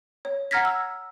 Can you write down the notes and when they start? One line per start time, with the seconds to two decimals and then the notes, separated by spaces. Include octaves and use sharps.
0.25 C#5
0.51 F#5 A#5 F6 G#6 A#6 B6
0.65 E6